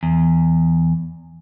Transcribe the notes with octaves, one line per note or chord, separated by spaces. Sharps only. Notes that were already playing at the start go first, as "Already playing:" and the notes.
E2